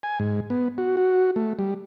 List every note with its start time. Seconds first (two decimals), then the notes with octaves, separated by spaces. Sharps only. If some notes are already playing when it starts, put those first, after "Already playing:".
0.03 G#5
0.20 G#2
0.50 B3
0.78 F#4
0.97 F#4
1.36 A3
1.59 G3